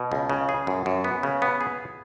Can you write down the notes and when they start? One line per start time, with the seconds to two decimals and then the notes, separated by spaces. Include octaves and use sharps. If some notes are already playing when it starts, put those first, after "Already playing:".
Already playing: B2
0.12 C#2
0.30 C#3
0.49 G#4
0.67 F#2
0.86 F#2
1.04 B3
1.23 C#3
1.42 B3
1.61 G#4